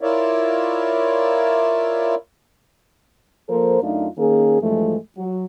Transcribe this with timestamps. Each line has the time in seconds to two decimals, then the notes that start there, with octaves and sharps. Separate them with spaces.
0.01 E4 F4 A#4 C#5 D5 E5
3.48 F3 A#3 A4 A#4 C5
3.82 F#2 A3 D4 D#4 F4
4.18 D#3 A#3 C#4 G#4
4.60 G2 E3 F3 G#3 A3
5.17 F#3 F#4